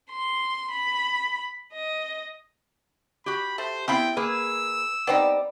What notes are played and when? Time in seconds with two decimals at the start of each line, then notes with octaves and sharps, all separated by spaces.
0.10 C6
0.70 B5
1.73 D#5
3.26 F#4 G4 B5
3.58 A3 C5
3.88 B3 C4 E4 F5 G5 B5 C6
4.17 A#3 G#4 B4 E6
5.07 G3 B3 C4 D#4 D5